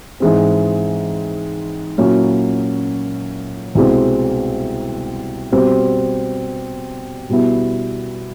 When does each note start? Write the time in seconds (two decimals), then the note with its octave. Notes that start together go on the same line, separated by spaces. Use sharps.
0.20 G#2 E3 G#3 C4
1.98 A#2 F#3 A#3 C#4 E4
3.75 C2 B2 G#3 C4
5.52 B2 G3 C4
7.29 B2 G3 B3 E4